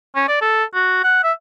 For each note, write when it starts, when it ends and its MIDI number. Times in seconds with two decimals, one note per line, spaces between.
0.15 0.24 61
0.28 0.38 74
0.42 0.64 69
0.74 1.01 66
1.04 1.22 78
1.24 1.33 76